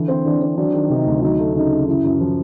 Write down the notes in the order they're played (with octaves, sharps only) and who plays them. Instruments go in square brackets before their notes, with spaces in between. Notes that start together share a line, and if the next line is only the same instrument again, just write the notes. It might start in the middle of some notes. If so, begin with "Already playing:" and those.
Already playing: [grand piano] D3 E3
C4
[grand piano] E3 [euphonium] D4
[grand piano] C4
[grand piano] F#3 [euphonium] D4
[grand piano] D#3
[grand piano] C3 [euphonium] D#4
[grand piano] D2
[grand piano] F#3 [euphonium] D#4
[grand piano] A3
[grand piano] C#3 [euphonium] D#4
[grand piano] C#3
[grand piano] F#2 [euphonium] E4
[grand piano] F#2
F3